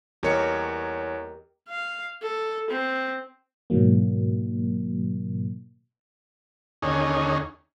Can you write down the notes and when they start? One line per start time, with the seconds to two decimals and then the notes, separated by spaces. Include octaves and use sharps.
0.23 E2 G4 A#4 C#5 D#5 C#7
1.69 F5
2.23 A4
2.70 C4
3.70 G#2 B2 D#3 F#3 A#3
6.82 D#2 D3 C#4 D#4 G#4